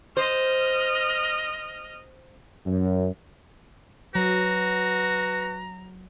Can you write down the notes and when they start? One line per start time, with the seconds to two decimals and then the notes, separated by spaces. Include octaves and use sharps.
0.17 C5 D#5 F6
2.66 F#2
4.15 F#3 F#4 B4 A#5